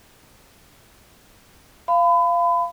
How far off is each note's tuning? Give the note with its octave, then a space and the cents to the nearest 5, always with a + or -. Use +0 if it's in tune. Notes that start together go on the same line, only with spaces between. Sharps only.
F5 -15 B5 +30